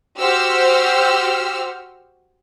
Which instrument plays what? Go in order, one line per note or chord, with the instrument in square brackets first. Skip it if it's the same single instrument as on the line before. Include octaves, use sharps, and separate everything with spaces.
[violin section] F#4 G4 C5 E6 F6